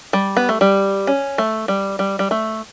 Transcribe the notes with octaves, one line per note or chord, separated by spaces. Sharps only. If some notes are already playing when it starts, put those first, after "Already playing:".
G3
B3
A3
G3
C#4
A3
G3
G3
G3
A3